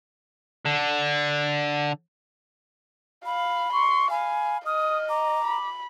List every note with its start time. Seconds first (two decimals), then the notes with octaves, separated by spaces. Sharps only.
0.65 D3
3.26 F5 B5
3.73 C6 C#6
4.10 F5 G#5 B5
4.66 D#5 D#6 F6
5.09 A#5 D6
5.44 B5